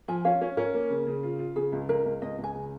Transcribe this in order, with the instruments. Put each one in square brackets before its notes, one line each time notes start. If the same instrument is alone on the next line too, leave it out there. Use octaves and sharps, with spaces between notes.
[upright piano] F3 [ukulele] G#5
[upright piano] C#4 [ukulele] F5
[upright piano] C#4
[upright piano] C#4 [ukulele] A#4
[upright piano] A#3
C#3
C#3
F4
F4
[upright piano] C#3 [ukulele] G#4
[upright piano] C#2
[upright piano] C#2 [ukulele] A#4
[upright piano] C#2
[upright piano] C#2 [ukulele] D#5
[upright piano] C#2
[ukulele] G#5
[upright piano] C#3